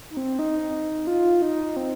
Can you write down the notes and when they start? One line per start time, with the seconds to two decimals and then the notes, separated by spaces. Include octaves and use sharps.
0.10 D#4
0.17 C4
0.39 D#4
1.07 F4
1.42 D#4
1.77 C4